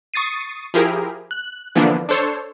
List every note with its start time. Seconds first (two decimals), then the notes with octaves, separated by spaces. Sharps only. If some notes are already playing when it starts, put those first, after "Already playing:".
0.14 C#6 D#6 A6 C7 D#7
0.74 F3 E4 G4 G#4 A#4
1.31 F#6
1.75 D3 E3 F3 A#3 B3 D4
2.09 D4 A4 C5 C#5